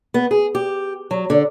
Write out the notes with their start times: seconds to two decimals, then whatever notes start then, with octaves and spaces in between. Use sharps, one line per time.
0.14 B3
0.31 G#4
0.55 G4
1.11 F#3
1.30 D3